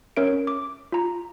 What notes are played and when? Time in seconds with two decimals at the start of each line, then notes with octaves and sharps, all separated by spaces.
0.17 C#4 A#4 C#5 E5 D7
0.47 D6
0.92 F4 A#5